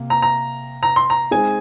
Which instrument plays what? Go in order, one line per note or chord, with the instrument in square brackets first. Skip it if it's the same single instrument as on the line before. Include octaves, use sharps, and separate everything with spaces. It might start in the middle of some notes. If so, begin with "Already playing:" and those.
Already playing: [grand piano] C3 A#3
[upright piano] A#5
A#5
A#5
C6
A#5
[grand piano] G#3 C4 D#4 G#4 [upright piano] G#5